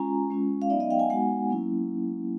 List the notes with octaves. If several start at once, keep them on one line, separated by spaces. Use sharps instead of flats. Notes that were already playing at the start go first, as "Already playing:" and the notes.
Already playing: G#3 C#4 F4 G#5 A#5
G#3 C#4 F4
F5
F#3 B3 D#4 D5 E5
D#5 F5
F5 G5
F#5 G#5
G#3 B3 D#4 F#4 F#5 G#5
F#3 A#3 C#4 E4